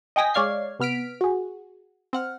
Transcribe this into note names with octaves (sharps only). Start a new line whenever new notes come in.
D#5 G5 G#5 A#6 B6
G#3 C#5 D5 F5 G#6 C7
C3 B3 F6 B6 D7
F#4 G#4
C4 F#5 F6